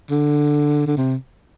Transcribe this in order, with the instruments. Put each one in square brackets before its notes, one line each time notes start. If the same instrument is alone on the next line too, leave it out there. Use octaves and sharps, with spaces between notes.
[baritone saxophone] D3
D3
C3